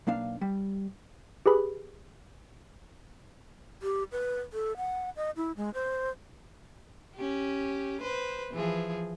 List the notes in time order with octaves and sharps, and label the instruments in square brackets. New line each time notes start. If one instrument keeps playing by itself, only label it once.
[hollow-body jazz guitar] B1 A#3 D4 F5
G3
[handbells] G4 G#4 B4 B5
[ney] G4
B4
A4
F#5
D#5
E4
G#3
C5
[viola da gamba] C#4 G4
B4 C5
E3 F3 G#4